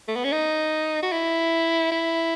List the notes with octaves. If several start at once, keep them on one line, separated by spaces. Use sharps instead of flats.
A3
B3
C#4
D#4
F#4
E4
E4